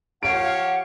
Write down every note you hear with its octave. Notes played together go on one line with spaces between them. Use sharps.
F3 G4 C#5 F5 F#5 D7